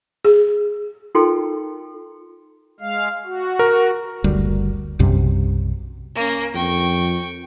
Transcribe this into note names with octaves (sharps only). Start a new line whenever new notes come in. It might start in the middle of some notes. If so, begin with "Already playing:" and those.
G#4
D#4 F4 A4 A#4 G5 C6
G#3 F5
F#4
A#4
F#1 D2 G3
B1 F#2 C3 G3
A#3 C#4
F2 G5 C#6